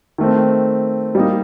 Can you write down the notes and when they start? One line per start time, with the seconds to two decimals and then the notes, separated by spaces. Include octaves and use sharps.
0.18 D#3 A3 C4
1.15 G3 A#3 D#4